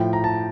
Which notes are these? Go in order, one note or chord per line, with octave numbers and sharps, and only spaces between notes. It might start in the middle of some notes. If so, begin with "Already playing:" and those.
Already playing: A2 F3 G5
A#5
A5